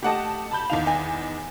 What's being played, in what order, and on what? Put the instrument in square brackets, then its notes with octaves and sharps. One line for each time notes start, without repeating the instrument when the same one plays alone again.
[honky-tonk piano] A3 F#5 A5 [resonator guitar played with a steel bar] G4 D#5
[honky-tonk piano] A5 B5 G6
[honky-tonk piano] E2 D#3 F7 [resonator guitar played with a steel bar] F5
[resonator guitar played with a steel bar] D#5 G#5